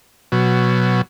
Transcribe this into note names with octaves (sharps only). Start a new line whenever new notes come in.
B2 F#3